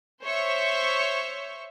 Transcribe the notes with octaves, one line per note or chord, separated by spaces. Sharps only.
C5 C#5 E5 C#6